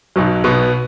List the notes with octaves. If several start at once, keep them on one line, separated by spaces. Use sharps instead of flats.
B1 B2 F#3
B2 B3